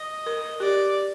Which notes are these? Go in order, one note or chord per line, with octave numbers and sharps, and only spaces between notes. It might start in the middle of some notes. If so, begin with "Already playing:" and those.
Already playing: D#5
A#4
G4 D5